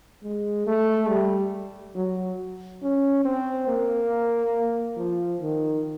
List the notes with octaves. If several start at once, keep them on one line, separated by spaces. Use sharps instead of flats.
G#3
A3
G3
F#3
C#4
C4
A#3
F3
D#3